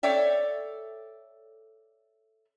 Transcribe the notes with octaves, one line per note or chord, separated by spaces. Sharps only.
A4 C#5 D5 E5 G5